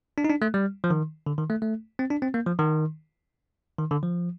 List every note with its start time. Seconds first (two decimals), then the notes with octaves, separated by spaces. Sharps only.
0.18 D4
0.24 D#4
0.29 D4
0.42 A3
0.54 G3
0.84 F3
0.90 D#3
1.26 D3
1.38 D#3
1.50 A3
1.62 A3
1.99 C4
2.11 D4
2.22 C4
2.34 A#3
2.46 F3
2.59 D#3
3.79 D#3
3.91 D3
4.03 F3